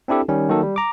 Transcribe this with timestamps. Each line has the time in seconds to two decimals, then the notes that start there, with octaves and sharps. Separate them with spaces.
0.08 C4 D4 E4 G4 A4
0.29 D#3 G3 C#4
0.49 D#3 F#3 A#3 A4
0.63 G3
0.76 A#5 D6